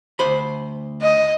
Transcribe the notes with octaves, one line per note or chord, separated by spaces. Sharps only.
D2 C5 B5
D#5